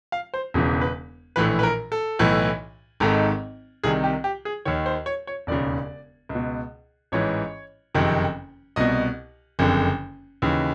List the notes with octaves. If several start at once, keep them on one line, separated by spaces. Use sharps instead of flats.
F5
C5
E1 E2 C#3 E3
B4
A#1 A2 E3 B4
B4
A#4
A4
B1 A2 E3
G#1 G#2 D#3 A4
C2 C3 D#3 G#4
G4
G4
G#4
D#2 D#3 C#5
C5
C#5
C#5
E1 D#2 C#3 D5
C#2
B2
A1 G#2 E3 C#5
F#1 F2 C3 D#3
C2 B2 D#5
F#1 F2 D3
D#2 C#3 E3